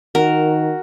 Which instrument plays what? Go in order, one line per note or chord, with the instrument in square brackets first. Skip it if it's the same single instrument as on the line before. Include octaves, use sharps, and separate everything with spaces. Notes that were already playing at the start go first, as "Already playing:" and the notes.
[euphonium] D#3 [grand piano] F#4 [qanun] A#4